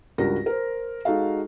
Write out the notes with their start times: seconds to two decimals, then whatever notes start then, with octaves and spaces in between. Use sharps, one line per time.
0.18 C#2 G2 F#4 A#4 A#6
0.46 A#4 C5
1.05 G#3 D#4 F#4 A4 F5